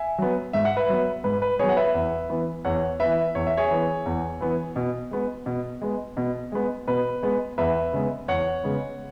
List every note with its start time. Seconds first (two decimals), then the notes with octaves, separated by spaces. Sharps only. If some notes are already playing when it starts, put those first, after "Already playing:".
Already playing: E5 G#5
0.18 F#3 B3
0.53 G#2 E5
0.65 F#5
0.77 B4 E5
0.89 F#3 B3
1.24 G#2 B4
1.42 B4
1.59 F#3 B3 G#4 C#5
1.69 F#5
1.77 B4 E5
1.94 E2
2.29 E3 B3
2.65 E2 C#5 F#5
3.00 E3 B3 B4 E5
3.35 E2 C#5
3.47 E5
3.57 G#4 C#5
3.70 E3 B3
4.06 E2
4.41 E3 B3
4.76 B2
5.11 G#3 B3
5.46 B2
5.82 G#3 B3
6.17 B2
6.52 G#3 B3
6.87 B2 B4
7.23 G#3 B3
7.58 E2 B4 E5
7.93 C#3 G#3 B3
8.28 E2 C#5 F#5
8.64 C#3 G#3 B3